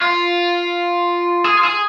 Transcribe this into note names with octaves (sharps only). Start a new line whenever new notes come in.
F4
G#4
F4
G#4